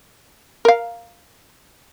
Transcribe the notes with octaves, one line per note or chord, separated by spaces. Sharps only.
A#4 F5